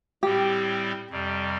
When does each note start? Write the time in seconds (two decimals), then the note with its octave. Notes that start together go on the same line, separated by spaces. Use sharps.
0.23 A2 G3 C4 E4 G4
1.10 F2 C3 G3